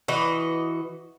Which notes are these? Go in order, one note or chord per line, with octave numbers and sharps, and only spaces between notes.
E3 F#4 D#5